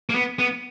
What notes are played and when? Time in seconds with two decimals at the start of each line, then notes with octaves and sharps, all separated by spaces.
0.10 A#3
0.15 B3
0.39 B3